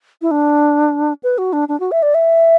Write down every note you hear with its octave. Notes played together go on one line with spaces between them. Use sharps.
E4
D4
B4
F#4
D4
D4
F#4
E5
D5
E5